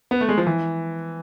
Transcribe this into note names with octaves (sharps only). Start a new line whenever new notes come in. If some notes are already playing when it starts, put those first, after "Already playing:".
B3
A3
G#3
F3
E3